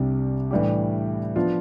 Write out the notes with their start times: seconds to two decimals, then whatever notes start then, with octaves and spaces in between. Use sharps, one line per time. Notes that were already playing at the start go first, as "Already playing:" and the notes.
Already playing: C2 C3 G3 D4 G4
0.51 A2 E3 G3 D4 G4
1.36 F3 B3 D4 F4